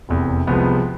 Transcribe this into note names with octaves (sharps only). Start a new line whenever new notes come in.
F1 E2 C3
C2 C3 F3 G#3 B3